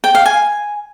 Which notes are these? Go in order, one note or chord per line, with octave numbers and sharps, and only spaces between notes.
G5
F5
G#5